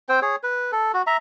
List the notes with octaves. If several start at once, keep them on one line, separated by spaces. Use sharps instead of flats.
C4 C5 G5
G#4 C#5
B4
A4
F#4
E5 A#5